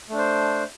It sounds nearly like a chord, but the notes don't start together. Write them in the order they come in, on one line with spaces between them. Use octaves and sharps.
A3 D4 C5